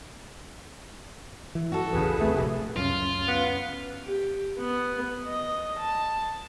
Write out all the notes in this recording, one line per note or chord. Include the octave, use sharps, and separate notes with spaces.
E3
F#4 A4
A1 E2 C#3 G#4 B4
C2 A3 C4
F1 A#1 C3
C#2 F#2 C#4 F4
B3
G4
B3
D#5
A5